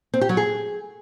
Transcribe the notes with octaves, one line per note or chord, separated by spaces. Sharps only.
C4
G4
F#3
G#4